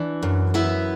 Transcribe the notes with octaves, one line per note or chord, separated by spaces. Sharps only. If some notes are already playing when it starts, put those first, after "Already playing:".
Already playing: E3 D4 D5
F#2
B3 E4 E5